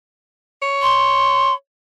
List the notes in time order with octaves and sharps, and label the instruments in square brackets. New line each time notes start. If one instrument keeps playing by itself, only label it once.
[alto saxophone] C#5
[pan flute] C6